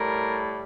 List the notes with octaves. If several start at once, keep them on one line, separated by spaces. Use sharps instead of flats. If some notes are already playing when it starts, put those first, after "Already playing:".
Already playing: A2 G3 A#4